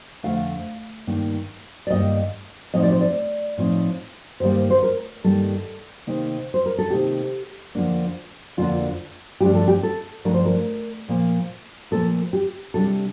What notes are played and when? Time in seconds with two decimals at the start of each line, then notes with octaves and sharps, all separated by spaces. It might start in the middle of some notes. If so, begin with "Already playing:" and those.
0.23 F2 D3 A3 F5
1.07 G2 D#3 A#3
1.87 D5
1.91 G2 D#3 A#3 D#5
2.74 A2 F3 C4 D#4 D#5
2.83 D5
2.91 C5
3.00 D5
3.58 A2 F3 C4 D#4
4.40 G2 D#3 G3 A#3 C5
4.70 C5
4.83 A#4
5.24 G2 D#3 G3 A#3 A4
6.07 C3 D#3 A#3 D#4
6.54 C5
6.66 A#4
6.78 A4
6.91 C3 D#3 A#3 D#4 G4
7.75 F2 D3 F3 A#3 D4
8.57 F2 D3 F3 A#3 D4 F4
9.41 G2 F3 A3 D4 G4
9.55 A4
9.68 G4
9.83 A4
10.25 G2 F3 A3 D4 A#4
10.34 C5
10.45 A#4
11.08 A#2 F3 A#3
11.91 A#2 F3 A#3 A4
12.33 G4
12.74 C3 G3 D4 A4